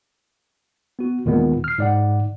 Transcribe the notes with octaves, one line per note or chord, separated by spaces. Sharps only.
B3 F#4
D#2 A#2 D#3 G#3 B3
F6 C7
G#2 D5 F#5